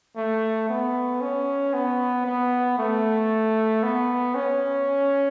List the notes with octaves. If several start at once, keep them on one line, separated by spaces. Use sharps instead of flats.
A3
B3
C#4
B3
B3
A3
B3
C#4